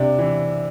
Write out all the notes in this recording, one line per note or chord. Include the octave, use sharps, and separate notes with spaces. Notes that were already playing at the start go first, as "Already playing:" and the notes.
Already playing: C3 D4
E3